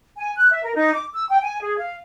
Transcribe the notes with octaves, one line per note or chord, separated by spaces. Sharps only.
G#5
F#6
E5
A#4
D#4
D6
E6
G5
G#5
G#4
F5